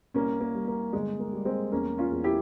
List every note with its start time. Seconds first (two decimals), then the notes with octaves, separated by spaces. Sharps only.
0.14 C2 A#3 C#4
0.41 A#3
0.55 G3
0.68 A#3
0.93 G1 G#3
1.20 A#3
1.32 G3
1.45 G#3 C4
1.72 E2 A#3 C#4
1.98 C#4 F4
2.11 E2
2.24 E4 G4